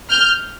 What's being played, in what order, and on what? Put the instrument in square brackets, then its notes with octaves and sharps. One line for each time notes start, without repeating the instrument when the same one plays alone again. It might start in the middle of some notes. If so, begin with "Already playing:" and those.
[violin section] F6 G6